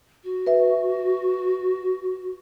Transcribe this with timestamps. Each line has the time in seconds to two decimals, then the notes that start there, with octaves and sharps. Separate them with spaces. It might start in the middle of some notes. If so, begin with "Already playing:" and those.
0.24 F#4
0.47 B4 E5